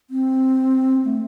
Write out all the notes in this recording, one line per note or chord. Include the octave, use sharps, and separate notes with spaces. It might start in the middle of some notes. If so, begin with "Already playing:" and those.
C4
A3